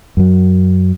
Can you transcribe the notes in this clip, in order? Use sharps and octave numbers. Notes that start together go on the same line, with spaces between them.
F#2 F#3